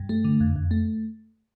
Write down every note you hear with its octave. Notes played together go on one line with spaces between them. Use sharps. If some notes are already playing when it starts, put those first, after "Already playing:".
Already playing: G2
A3
D3
F2
F2
A3